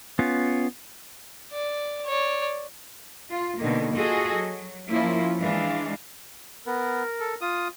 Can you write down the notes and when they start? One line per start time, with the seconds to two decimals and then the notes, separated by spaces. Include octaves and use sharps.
0.19 B3 C#4 F4
1.52 D5
2.06 C#5 D5
3.31 F4
3.60 B2 D3 D#3 A#3
3.95 F4 F#4 G#4 A4 D#5
4.33 F#3
4.90 F3 A#3 C#4 E4 F4
5.40 E3 G#3 D4 F5
6.66 B3 A#4
7.20 A4
7.41 F4 D#6